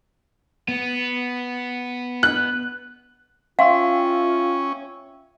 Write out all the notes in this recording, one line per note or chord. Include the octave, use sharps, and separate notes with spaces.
B3
F#6
C#4 F4 E5 F5 G5 C6 E6